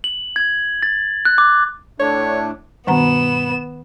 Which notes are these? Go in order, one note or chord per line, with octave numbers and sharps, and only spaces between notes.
F#7
G#6
A6
F#6
D6
A2 A3 D4 C#5
G2 B2 D#3 B3 F#5 A#5 E7